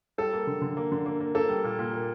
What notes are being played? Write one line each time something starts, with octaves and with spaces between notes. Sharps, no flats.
G3 A4
A#3
D3
D3
A#3
D3
A#3
A#3
A#3 A4
G3
A#2
A#2
A#3